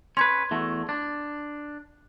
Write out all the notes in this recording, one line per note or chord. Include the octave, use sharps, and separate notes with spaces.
C#4 B4 C6 G#6
E2 A3 F#4
D4